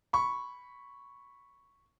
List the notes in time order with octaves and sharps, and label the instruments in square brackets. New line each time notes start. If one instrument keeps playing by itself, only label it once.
[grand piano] B5 C#6